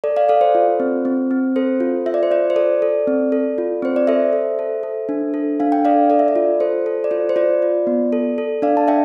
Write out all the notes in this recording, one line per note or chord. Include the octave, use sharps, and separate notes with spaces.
A4 D5
D5 F5
A4 D5 F5
C5
F4
C4
C4
C4
A4 C5
F4
F4 E5
D5
C5
F4 D5
C5
A4 D5
A4
C4
A4
F4
C4 C5
D5
A4 C5 E5
A4
A4
A4
D4
A4
D4 F5
G5
A4 D5 F5
A4 D5
E5
D5
F4
A4 C5
A4
D5
F4 C5
C5
F4 D5
F4
B3
A4
A4
D4 D5 F5
A5
D4 E5 G5